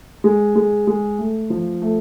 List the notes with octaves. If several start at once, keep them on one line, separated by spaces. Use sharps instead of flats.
G#3
G#3
G#3
A3
F3
A3